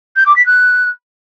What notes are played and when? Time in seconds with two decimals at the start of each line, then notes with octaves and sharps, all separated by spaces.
0.16 G6
0.26 D6
0.36 B6
0.46 F#6